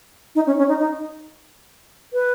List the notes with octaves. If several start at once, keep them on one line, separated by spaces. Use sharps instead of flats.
D#4
C#4
C#4
D#4
D#4
B4